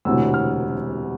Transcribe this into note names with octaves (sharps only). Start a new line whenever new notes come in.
E1 D2 C3 E3 E6
F6